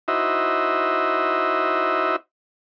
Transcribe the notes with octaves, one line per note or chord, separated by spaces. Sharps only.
D#4 E4 F#4 C5 D#5 E5